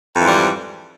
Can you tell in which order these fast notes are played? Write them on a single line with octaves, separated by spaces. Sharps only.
F2 E3 G#2 G3